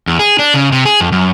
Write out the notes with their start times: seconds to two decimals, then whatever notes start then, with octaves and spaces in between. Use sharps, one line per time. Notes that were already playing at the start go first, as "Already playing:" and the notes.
0.07 E2
0.19 G#4
0.39 D4
0.54 C#3
0.72 C3
0.85 G#4
1.01 F2
1.12 F#2